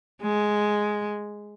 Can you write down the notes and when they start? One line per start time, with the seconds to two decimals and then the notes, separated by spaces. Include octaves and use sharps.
0.22 G#3